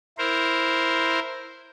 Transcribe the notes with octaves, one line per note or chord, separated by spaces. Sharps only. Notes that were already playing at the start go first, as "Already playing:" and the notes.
E4 A#4 C5